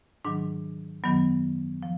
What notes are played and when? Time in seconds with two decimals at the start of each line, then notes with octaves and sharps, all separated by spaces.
0.25 G#2 D#3 F#3 D4
1.04 F#2 D#3 F#3 B3
1.83 F3